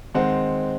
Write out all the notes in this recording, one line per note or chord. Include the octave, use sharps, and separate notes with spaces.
D#3 G#3 C4 F#5